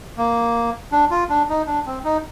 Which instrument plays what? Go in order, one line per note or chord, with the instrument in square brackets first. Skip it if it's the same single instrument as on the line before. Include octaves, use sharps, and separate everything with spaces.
[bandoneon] A#3
D4
F4
D4
D#4
D4
C4
D#4